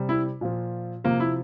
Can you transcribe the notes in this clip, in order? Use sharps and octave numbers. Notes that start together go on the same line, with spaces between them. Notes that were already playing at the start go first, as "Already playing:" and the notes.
Already playing: C3 G3
E4
A#2 F3
C3 F3 A#3
E4